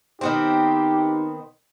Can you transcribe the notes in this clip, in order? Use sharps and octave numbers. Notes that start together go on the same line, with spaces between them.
D#3 B3 C4 D#4 G4